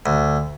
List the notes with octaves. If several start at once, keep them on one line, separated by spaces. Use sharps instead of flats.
D2